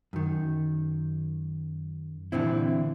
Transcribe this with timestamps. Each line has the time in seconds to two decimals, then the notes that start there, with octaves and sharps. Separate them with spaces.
0.13 F#2 D#3
2.32 A#2 D3 E3 C4 E4